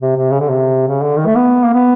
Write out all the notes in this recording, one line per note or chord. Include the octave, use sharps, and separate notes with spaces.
C3
C3
C#3
D3
C3
C#3
D3
D#3
A3
B3
A#3
B3